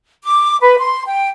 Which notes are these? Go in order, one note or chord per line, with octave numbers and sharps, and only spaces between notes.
D6
B4
C6
G5